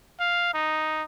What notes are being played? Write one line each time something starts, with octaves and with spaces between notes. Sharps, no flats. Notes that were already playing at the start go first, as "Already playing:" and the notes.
F5
D#4